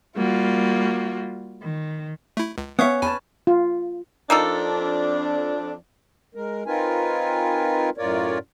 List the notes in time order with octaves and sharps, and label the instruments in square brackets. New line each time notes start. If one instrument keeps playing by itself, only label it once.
[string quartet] G3 A#3 F4 F#4
D#3
[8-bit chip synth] A3 E4
C#2
[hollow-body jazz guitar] B3 C#5 [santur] C#4 [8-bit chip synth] E5 F5 D#6
[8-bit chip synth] E2 G#5 [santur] B4 A5
[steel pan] F4
[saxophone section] F2 D4 [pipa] A#3 D#4 A4
[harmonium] G#3 A#4
C4 D#4 F4 A#4 B4 G#5
F#2 A2 F4 A#4 C#5 D5